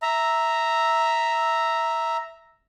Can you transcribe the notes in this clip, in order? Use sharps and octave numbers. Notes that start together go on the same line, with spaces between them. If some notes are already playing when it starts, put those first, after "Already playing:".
E5 A#5